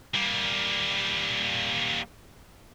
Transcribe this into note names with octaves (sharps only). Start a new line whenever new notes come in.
G3 A#3